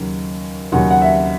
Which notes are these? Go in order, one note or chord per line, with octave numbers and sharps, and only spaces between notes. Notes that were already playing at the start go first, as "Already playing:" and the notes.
Already playing: D#2 C#3 F#3
D#2 C#3 F#3 F#5
F#5
E5